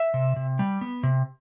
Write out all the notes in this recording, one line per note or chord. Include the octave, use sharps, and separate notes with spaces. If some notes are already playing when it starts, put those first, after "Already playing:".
Already playing: E5
C3
C3
G3
B3
C3